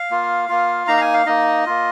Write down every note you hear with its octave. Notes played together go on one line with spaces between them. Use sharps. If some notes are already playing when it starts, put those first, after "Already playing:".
Already playing: F5
A#3 F4
A#3 F4
A#3 D#4 A#5
F5
G#5
F5
A#3 D#4 D#5
A#3 F4